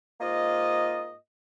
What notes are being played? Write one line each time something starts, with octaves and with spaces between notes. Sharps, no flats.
G#2 A#3 F4 D#5